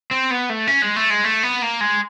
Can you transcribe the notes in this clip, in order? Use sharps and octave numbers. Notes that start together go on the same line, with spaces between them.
C4
B3
A3
C#4
G#3
A3
G#3
A3
B3
A#3
G#3